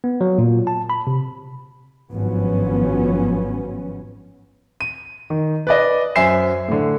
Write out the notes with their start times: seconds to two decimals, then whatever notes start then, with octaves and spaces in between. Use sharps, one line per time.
0.04 B3
0.21 F#3
0.38 A#2
0.67 A5
0.90 B5
1.07 C3
2.12 G#1 G2 F3 F#3 B3 C#4
4.81 D#7
5.30 D#3
5.67 B4 D5 D#5
6.16 F#2 C5 E5 G#5 C7 E7
6.68 A2 D3